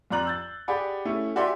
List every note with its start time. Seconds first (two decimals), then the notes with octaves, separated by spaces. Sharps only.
0.10 F2 F4 D5 A#5 F#6 F#7
0.25 E6 G6 A6
0.68 G4 G#4 D5 F#5 G#5 B5
1.05 A3 C#4 E4
1.36 F#4 G4 D5 E5 G#5 C6